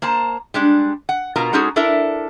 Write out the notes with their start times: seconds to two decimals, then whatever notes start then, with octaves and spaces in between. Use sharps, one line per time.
0.02 A#3 C5 A5 A#5
0.54 G3 G#3 D4
1.09 F#5
1.36 B2 F4 A#4 A#5
1.53 G#3 C#4 D#4 F#4 G#4 A4
1.76 D4 E4 A4 A#4 D5 E5